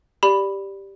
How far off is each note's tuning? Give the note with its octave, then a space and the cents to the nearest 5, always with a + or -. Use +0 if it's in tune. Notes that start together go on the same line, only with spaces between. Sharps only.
G4 +0 D5 +0 B5 +0